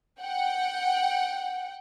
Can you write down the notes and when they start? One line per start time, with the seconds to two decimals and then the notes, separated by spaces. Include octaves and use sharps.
0.21 F#5 G5